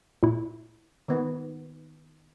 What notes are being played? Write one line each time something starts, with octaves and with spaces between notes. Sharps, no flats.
A#2 E4
D#3 B3